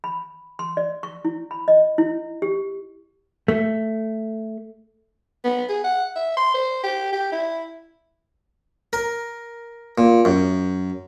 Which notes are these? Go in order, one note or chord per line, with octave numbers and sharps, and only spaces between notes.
B5
C6
D5
C#6
E4
B5
D#5
E4
G4
A3
B3
G#4
F#5
E5
C6
C5
G4
G4
E4
A#4
A#2
F#2